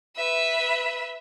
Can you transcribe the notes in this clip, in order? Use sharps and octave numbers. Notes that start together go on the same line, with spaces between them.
B4 E5